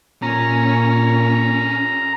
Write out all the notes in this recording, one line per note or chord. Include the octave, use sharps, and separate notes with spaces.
A#2 C#4 A#5